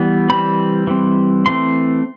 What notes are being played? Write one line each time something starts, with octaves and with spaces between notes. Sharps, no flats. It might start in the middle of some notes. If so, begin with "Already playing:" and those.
Already playing: E3 G3 B3
E3 G3 C4 B5
E3 G3 C4
E3 A3 C4 C6